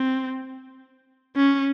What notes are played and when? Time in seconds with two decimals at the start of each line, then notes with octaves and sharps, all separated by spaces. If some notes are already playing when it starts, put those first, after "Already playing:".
Already playing: C4
1.36 C#4